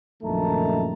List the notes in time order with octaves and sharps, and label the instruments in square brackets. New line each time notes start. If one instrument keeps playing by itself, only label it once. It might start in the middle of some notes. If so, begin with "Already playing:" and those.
[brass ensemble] A#1 F#2 D#3 A3 A5 A#5